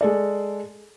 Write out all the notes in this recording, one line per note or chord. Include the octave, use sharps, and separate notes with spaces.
G#3 A4 D5